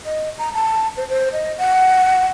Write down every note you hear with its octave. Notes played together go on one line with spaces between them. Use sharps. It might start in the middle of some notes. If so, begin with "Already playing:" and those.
D#5
A#5
A5
C5
C5
D#5
F#5